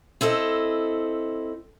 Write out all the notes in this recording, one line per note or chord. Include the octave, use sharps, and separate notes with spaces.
C4 E4 A4 D#5